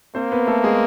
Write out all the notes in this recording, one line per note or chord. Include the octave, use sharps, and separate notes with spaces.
A#3 C4 C5
B3 B4
A3 A4
G#3 G#4